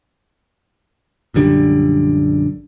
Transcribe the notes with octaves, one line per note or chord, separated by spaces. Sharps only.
A#1 F#2 D3 G3